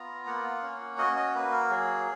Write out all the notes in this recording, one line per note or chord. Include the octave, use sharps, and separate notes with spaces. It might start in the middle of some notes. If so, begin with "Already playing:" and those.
Already playing: B3 F4 A#5
A#3 F#5
C#4
F#4 D#5
D#5
A#3 B4
A#4
F#3 G#4